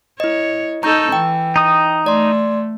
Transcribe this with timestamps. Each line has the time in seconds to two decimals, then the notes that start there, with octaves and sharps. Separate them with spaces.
0.20 E4 C#5 D#5
0.83 D#4 A4 A#5 C#6 G6
1.12 E3 G5
1.56 D#4 D#6
2.06 A3 D5 C6